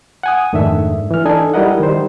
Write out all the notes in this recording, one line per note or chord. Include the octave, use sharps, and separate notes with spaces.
F#5 G#5 D#6
F2 G#2 D#3 A3 D4 E5
E3 F6
D4 D#4 A4 D5 D#5 G#5
G3 E4 A#4 D#5 F#5
D#3 G3 C5